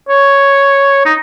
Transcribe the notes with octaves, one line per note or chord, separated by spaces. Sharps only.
C#5
D#4